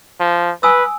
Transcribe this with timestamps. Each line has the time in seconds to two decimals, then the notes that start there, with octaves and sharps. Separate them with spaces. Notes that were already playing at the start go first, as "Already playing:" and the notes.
0.20 F3
0.63 B4 G#5 D#6 E6